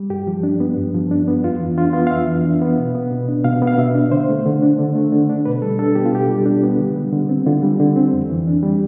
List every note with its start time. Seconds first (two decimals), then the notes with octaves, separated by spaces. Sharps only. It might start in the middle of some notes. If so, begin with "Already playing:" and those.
Already playing: G3
0.10 G2 G4
0.27 F3
0.43 D4
0.60 B3
0.77 G2
0.94 F3
1.11 D4
1.28 B3
1.44 F2 F4
1.60 E3
1.77 D4 F4
1.93 B3 F4
2.07 F5
2.11 F2 E5
2.28 E3
2.45 D4
2.62 B3
2.78 B2
2.95 B3
3.12 B2
3.29 D4
3.45 B2 F5
3.62 B3
3.67 F5
3.78 B2 E5
3.95 D4
4.12 D3 C5
4.29 A3
4.46 D3
4.62 D4
4.79 D3
4.95 A3
5.12 D3
5.29 D4
5.45 B2 B4
5.62 G3 A4
5.79 D4 A4
5.95 B3 G4
6.05 F4
6.13 B2 G4
6.29 G3
6.46 D4
6.63 B3
6.80 D3
6.96 G3
7.13 D3
7.29 C4
7.46 D3 F4
7.63 G3
7.80 D3
7.96 C4
8.13 F2
8.29 E3
8.47 D4
8.63 G3